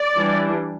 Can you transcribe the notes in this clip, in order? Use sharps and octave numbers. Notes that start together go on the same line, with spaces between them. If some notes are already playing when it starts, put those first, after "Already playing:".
Already playing: D5
E3 G3 D4